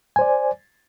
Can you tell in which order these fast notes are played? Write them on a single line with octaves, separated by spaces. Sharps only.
G#5 C5 D5